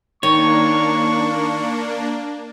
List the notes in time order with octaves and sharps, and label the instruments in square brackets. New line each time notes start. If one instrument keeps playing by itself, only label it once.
[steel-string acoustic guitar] D#3 [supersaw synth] A#3 D4 [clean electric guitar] C#5 [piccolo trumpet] C#6